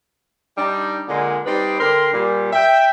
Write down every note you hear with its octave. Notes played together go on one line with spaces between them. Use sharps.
G3 D4 D#4
A#2 D3 G#3
G3 C4 D#4 B4 D5 D#5
D3 A#4 G5 C6
A#2 G3
E5 G5